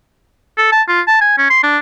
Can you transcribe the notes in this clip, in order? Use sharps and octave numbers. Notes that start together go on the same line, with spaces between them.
A4
A5
F4
A5
G#5
C#4
C6
D4